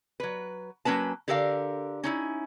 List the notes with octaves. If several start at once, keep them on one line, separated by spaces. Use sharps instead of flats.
F#3 B4
F#3 A#3 C#4 B4 A5
D3 G4 A4 A#4 C5 F5
C#4 D#4 E4